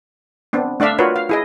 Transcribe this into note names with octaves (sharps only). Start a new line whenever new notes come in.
B3 C4 D4
A3 D4 D5 E5 F5
F4 F#4 A#4 B4 C#5
F5
E4 G#4 D#5